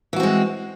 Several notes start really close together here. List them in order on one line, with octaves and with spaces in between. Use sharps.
E3 F#4 C4 G#3